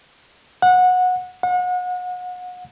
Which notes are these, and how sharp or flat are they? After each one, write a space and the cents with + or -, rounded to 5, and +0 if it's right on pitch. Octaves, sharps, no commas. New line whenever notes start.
F#5 -20
F#5 -35